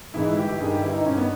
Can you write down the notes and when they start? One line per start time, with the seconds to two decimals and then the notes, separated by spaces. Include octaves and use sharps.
0.14 G#2 E3 G#3 E4
0.31 E4
0.37 G1 G4
0.48 G4
0.60 G2 D#3 G#4
0.71 G4
0.82 G1 E4
0.94 D#4
1.05 G2 C#4
1.10 D#3
1.17 B3